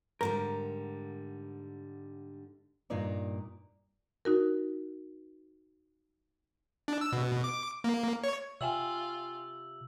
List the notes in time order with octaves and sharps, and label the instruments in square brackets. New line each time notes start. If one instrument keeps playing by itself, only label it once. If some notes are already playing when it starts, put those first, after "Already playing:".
[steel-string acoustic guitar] G#2 D3 G3 [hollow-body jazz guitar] A#4
[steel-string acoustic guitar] G2 A#2 D#4 D5 A#5
[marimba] D#4 F#4 A#4
[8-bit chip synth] D4
E6
B2
D6
A#3
C#5
[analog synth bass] C3 [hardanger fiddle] F4 [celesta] E5 G5 G#5 [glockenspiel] E6 F#7